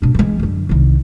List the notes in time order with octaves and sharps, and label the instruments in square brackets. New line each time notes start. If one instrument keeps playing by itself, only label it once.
[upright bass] B2 D4
E3 G#3
F#2 D3
C2 D#3